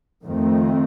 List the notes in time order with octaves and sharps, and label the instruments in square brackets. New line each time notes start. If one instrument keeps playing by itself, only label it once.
[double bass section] F2 D#3 A3 C4